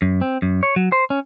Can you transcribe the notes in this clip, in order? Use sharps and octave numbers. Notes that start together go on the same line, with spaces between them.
F#2
C4
F#2
C#5
F#3
C5
C#4